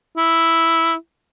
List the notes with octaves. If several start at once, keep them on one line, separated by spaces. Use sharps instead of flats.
E4